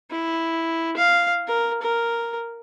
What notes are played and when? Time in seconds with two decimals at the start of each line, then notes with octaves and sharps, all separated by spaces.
0.11 E4
0.97 F5
1.48 A#4
1.82 A#4